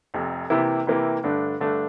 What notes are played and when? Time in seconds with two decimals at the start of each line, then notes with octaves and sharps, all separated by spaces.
0.14 F1 F2 C3
0.50 C3 E3 A#3 E4 G4
0.87 C3 E3 A#3 E4 G4
1.24 G2 D3 A3 D4
1.60 G2 D3 A3 D4